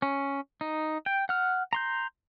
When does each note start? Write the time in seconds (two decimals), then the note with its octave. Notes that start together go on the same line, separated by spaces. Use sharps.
0.02 C#4
0.61 D#4
1.06 G5
1.29 F#5 F6
1.73 A#5 C6 G6